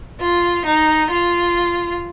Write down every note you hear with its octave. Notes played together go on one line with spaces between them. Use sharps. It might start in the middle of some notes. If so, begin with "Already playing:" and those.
F4
D#4
F4